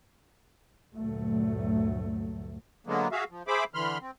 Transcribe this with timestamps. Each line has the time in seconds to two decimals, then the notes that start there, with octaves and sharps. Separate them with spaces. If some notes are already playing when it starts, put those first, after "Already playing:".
0.97 D2 G2 A#2 F#3 A3
2.87 D3 F#3 G#3 A#3 B3
3.12 F#4 G#4 E5 F5
3.30 F3
3.47 G#4 C5 E5 B5 D6
3.74 D3 E3 B5 C6 F6
4.01 C4